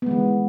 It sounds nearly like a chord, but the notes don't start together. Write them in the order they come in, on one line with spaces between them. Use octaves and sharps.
B3 G#3 E3